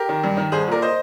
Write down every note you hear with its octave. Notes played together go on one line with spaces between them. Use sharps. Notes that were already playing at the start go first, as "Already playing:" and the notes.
Already playing: G4 A#4
D#3
G2
D#3
C2 G#4 C5
A#2 A#4 D5
C5 D#5